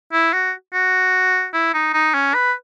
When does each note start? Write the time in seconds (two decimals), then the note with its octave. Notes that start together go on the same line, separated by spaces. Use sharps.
0.13 E4
0.33 F#4
0.74 F#4
1.54 E4
1.74 D#4
1.94 D#4
2.14 C#4
2.34 B4